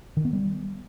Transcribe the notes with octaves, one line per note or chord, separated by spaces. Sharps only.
D#3
B3
G3